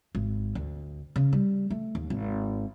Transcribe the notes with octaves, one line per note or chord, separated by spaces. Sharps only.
G#1
D2
C#3
G3
A3
D#2
G#1